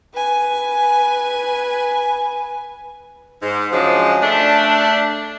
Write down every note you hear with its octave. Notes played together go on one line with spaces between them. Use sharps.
B4 G#5
G#2
C#3 F3 F#3 G#3 D4
A3 D4